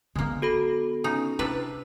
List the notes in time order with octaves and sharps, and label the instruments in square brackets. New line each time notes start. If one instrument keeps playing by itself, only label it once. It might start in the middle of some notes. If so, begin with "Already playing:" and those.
[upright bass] D3 B3 [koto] G#3 A#3
[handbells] F#4 A4 B5
[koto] C#3 D#4
[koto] C3 D4 B4 [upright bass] E4